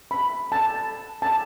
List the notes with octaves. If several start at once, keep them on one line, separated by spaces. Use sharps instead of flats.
B5
A5
A5